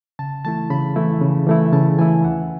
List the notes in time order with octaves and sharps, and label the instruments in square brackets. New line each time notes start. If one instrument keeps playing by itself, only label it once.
[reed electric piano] C#3 A5
E3 A3 E4 A5
C#3 B5
E3 A3 E4
C#3
E3 A3 E4
C#3 A5
E3 A3 E4 G#5
D#2 F#5